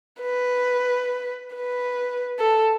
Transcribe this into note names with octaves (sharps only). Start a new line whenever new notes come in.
B4
B4
A4